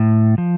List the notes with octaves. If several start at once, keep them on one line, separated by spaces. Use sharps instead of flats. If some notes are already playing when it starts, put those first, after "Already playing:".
Already playing: A2
F3